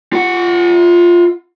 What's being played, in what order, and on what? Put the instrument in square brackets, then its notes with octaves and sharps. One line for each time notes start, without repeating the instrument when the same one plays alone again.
[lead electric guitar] F4 F#5